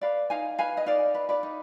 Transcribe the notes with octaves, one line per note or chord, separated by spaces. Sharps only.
B4 D5 F5
D#4 F5 G#5
B4 F5 G#5
D#5
D#4 D5 F5
B4
B4 D5
D#4